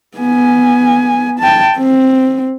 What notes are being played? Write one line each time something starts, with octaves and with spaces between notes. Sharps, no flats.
B3 G#5
G5 A5
C4